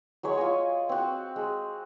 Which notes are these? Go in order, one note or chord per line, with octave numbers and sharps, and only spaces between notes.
F#3 G#3 C#5 C#6
F4 C#5 D#5 G#5
C4 F#4
G#3